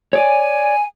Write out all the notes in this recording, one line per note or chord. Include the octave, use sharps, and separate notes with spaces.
C#5 D5 G#5